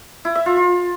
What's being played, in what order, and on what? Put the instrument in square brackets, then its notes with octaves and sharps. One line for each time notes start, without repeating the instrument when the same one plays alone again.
[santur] E4
E5
F4
F4